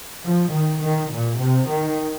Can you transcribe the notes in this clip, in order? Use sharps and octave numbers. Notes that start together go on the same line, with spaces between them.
F3
D#3
D#3
A#2
C3
D#3